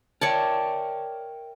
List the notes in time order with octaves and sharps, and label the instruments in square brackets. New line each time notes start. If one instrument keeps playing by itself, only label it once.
[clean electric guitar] A#4 E5 G5 [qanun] C#5 D5 A5